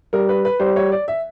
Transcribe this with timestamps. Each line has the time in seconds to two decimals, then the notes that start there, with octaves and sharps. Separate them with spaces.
0.13 G3 A#4
0.29 B4
0.45 B4
0.60 G3 C5
0.76 C#5
0.92 D5
1.08 E5